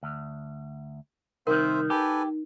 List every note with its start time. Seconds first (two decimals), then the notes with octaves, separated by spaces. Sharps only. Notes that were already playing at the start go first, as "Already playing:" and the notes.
0.03 D2
1.47 C2 D#3 C4 D#4 A#4 C5 E5
1.90 G4 A4 B4 G#5